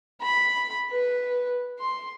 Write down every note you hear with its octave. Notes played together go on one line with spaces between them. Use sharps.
B5
B4
C6